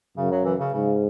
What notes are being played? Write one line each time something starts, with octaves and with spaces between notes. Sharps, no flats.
F#2 C#3
F#3
E3
C#3
G#2 C#3